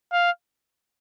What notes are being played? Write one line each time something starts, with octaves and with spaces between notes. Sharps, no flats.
F5